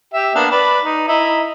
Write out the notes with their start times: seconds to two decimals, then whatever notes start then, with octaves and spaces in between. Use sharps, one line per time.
0.14 G4 E5
0.35 A#3 B3 D4
0.51 B4 D5
0.83 D#4
1.08 E4 D#5 A#5